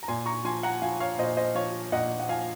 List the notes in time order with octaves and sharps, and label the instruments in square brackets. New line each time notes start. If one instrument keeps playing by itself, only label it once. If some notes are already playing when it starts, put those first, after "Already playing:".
[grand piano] A#5
A#2 G#5 C6
A#5 C#6
F3 G#5 C6
F#5 A#5
F3 F5 G#5
C#5 F5
A#2 C5 D#5
C5 D#5
F3 C#5 F5
A#2 D#5 F#5
F#5
F3 F5 G#5